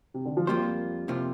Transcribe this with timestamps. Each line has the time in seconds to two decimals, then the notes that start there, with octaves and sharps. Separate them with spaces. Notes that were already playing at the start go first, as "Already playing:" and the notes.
0.14 C3
0.25 D3
0.37 F3
0.47 F2 C3 G3 A#3 F4 C5
1.08 F2 C3 A#3 F4 C5